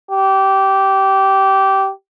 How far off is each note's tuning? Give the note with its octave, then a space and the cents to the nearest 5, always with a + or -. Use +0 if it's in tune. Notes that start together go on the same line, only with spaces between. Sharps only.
G4 -15